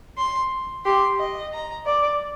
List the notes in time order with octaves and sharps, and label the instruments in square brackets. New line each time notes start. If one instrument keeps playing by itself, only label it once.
[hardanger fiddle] C6
[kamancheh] G4 [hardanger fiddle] C6
[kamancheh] D#5
[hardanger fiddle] A#5
[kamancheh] D5